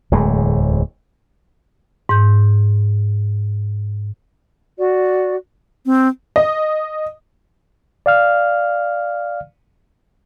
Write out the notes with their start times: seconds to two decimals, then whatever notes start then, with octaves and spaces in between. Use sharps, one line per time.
0.12 D1 E2 A2 G#3
2.09 G#2 G6
4.77 F#4 D5
5.86 C4
6.36 D#5
8.06 D5 F5 F6